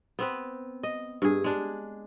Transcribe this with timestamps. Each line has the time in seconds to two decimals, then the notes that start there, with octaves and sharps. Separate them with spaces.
0.19 B3 C4 B4
0.83 D#5
1.22 G2 G#4
1.44 G#3 D4